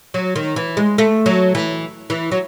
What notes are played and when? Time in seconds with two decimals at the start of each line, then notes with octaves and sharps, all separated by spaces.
0.14 F#3
0.36 D#3
0.56 E3
0.77 G#3
0.98 A3
1.26 F#3
1.55 E3
2.10 E3
2.32 F#3